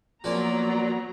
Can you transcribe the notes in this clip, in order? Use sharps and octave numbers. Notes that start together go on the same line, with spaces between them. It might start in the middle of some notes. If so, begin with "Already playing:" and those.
F3 F#3 A#3 B3 C#4 D5 A#5